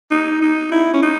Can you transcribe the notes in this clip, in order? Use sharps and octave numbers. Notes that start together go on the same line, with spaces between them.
D#4
D#4
E4
C#4
D#4